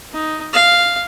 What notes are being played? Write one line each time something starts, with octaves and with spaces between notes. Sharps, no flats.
D#4
F5